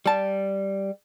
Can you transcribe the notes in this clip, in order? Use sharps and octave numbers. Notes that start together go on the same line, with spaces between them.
G3 A5